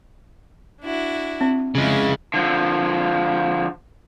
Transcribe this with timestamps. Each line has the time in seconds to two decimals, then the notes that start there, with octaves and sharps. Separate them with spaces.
0.81 D4 E4 F#4
1.41 C4
1.75 F2 C#3 G#3 E4 F5
2.34 D3 F3